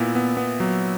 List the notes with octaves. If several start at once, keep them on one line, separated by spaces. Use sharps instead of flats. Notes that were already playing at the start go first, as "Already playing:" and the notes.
Already playing: A#2 B3 E4
B3
B3
F#3